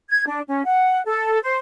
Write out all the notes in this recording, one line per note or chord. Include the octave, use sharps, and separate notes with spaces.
G#6
D4
C#4
F#5
A4
C5